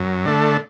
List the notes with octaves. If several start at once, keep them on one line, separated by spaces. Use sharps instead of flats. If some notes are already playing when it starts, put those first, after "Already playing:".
Already playing: F#2
D3 A3